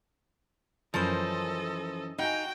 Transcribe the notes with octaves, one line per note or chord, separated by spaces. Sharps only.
F#2 E3 F3 C#4 A4 A#4 C5 D#5
D#4 F#4 F5 G5 G#5